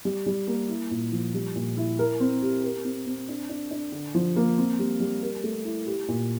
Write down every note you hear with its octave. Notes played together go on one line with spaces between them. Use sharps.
G3
G3
A#3
E4
A#2
F3
G3
A#2
E4
A#4
C4
G4
A#4
C4
C4
D4
D4
D4
D3
F3
A#3
C4
G3
G3
A#4
A3
E4
G4
A#2